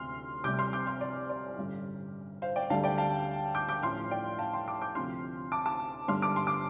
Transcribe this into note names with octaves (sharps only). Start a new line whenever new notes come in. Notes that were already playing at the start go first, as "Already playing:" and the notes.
Already playing: D2 C3 C6 F6
C2 C3 G3 D6 G6
C6 F6
D6 G6
C6 F6
D5
D5
A1 G2 D3
C5 F5
D5 G5
D2 D3 G3 F5 A5
D5 G5
F5 A5
D6 G6
D6 G6
A1 A2 F3 C6 F6
D5 G5
F5 A5
G5 C6
A5 D6
D6 G6
D2 C3 F3 C6 F6
A5 D6
A5 D6
G1 G2 D3 G3 C6 F6
A5 D6
C6
D6